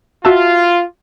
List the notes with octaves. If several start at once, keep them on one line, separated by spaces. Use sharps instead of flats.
F4 F#4 E5 A5